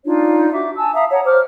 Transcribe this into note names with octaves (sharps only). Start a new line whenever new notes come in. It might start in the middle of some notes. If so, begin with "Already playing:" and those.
D4 D#4 F4 C#5
F#4 E5 D6
G#5 A5 E6
E5 F5 A#5 D#6
C#5 F#5 A5 A#5
C5 D6 F6